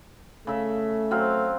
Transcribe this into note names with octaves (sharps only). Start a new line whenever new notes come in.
C#3 A3 E5
F#3 C4 F5